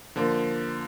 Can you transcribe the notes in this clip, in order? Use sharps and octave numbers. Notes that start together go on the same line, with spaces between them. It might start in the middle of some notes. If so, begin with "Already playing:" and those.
D3 F3 A#3